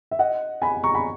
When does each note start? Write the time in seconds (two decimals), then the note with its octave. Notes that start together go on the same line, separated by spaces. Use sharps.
0.11 E5
0.19 D#5 F#5
0.62 G#5 B5
0.84 A#5 C#6
0.95 G#5 B5